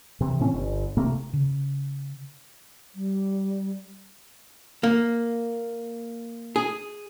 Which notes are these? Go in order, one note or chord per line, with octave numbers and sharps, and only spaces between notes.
C3 E3
A2 C4 C#4
G1
C3 A3 A#3
C#3
G3
A#3
G#4